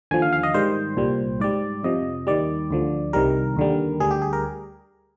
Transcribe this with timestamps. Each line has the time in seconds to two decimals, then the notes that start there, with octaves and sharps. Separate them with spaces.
0.11 D#2 D3 F3 G#5
0.22 F5
0.33 F5
0.43 D#5
0.54 G#2 D#3 G3 C5
0.97 C2 A#2 G3
1.40 G#2 G3 D5
1.83 F2 C3 F3 D#5
2.27 D#2 D#3 G3 D5
2.71 D2 D3 F3
3.13 C2 C3 D#3 G3 A#4
3.57 D#2 D3 G3
4.00 D2 D3 G3 G#4
4.11 G4
4.22 G#4
4.33 A#4